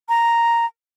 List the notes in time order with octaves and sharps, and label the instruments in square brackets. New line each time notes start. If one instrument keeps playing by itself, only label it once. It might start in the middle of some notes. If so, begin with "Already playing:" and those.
[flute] A#5